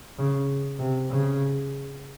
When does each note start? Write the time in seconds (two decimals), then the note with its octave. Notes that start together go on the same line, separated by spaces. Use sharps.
0.19 C#3
0.79 C3
1.09 C#3